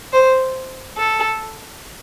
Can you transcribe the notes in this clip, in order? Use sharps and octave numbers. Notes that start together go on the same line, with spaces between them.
C5
A4